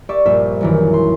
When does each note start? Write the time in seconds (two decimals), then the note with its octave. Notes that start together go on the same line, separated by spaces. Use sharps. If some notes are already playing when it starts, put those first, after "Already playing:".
0.09 G4 D5 E5 C#6
0.26 A#1 G2 C5 E5
0.61 F#2 D#3 E3
0.94 C6